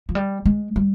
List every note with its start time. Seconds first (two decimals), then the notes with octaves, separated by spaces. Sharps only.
0.09 F3
0.15 G3
0.45 G#3
0.76 G3